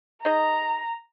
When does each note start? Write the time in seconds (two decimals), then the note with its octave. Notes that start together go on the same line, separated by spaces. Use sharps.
0.25 D#4 G#4 D#5 A#5